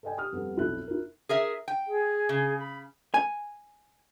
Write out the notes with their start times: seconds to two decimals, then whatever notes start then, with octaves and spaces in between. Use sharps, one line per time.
0.03 A4 D5 D#5 G5 G#5
0.17 G4 D#6 F6
0.32 F2 G3 B3 A4
0.56 B1 F2 E4 A4 E5 F#6
0.88 E4 A#4
1.29 G#4 A#4 E5
1.68 G5
1.87 G#4
2.29 C#3
2.58 B5
3.14 G#5